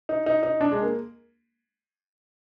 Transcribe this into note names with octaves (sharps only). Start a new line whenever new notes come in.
D#4
D#4
D#4
D4
G#3
A#3